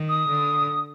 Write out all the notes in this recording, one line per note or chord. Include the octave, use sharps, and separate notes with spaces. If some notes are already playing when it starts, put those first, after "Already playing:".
Already playing: D#3
D#6
D3